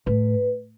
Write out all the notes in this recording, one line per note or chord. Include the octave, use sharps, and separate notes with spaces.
A2 B4